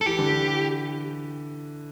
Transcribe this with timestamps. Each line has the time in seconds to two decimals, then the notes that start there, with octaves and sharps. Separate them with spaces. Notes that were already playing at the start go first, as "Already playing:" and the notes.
0.01 A4
0.06 E3 G4
0.19 D3
0.32 E3